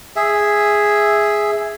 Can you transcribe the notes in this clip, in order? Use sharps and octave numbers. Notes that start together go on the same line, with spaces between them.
G#4 E5